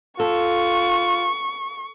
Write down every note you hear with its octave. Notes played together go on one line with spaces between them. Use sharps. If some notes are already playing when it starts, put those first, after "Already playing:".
F4 A4 C#6